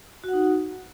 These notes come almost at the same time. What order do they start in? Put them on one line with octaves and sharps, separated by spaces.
F#4 F#5 D#4